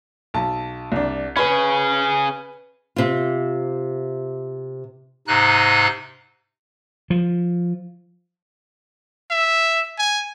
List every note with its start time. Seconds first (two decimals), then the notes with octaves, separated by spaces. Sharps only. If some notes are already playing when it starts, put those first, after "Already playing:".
0.34 B1 A5
0.92 C2 D4
1.37 C#4 G#4 B4 B5
2.96 C3 F4
5.27 G#2 C3 D#4 F#6
7.10 F3
9.31 E5
9.98 G#5